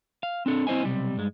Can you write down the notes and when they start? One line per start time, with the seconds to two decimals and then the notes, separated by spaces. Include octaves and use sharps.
0.23 F5
0.46 C4 D4 A4
0.67 C4 E4 C5 D#5 G#5
0.84 B1 C3 G3
1.17 G2 G#3